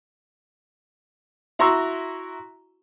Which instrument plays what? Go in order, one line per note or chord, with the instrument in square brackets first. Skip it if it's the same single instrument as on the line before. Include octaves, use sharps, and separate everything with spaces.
[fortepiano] E4 F#4 A#5 C6 C#6 E6